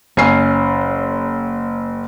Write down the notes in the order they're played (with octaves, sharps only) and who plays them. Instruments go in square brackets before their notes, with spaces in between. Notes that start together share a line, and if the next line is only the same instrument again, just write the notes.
[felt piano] F#1 C7 [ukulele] C#4